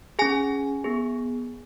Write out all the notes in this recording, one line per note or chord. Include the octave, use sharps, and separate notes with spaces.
C#4 G#4 G#5
B3 G#4